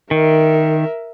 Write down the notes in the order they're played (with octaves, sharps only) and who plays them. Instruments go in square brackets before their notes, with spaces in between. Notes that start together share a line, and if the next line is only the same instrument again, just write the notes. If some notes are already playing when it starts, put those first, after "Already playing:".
[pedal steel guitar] D#3 [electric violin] A#4 E5